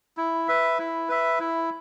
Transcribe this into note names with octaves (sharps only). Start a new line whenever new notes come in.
E4
B4 E5
E4
B4 E5
E4